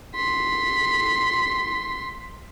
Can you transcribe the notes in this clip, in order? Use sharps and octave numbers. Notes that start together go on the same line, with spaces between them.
C6 B6